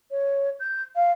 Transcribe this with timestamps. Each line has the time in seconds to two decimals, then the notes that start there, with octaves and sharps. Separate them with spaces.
0.11 C#5
0.60 G6
0.95 F5